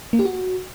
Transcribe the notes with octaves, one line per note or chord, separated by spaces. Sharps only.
A#3
G4
F#4